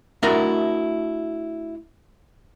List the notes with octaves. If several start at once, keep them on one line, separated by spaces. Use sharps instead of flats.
A3 D4 E4 F#4 A#4 D#5